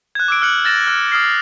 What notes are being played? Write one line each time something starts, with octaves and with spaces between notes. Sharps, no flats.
F#6 G#6
D6 E6 D7
F6 F#6 C#7 F#7
F6 A6 A#6 E7
F6 F#6
D#6 F6 C7